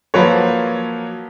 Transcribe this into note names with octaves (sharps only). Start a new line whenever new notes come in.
F3 F#3 A#3 B4 C#5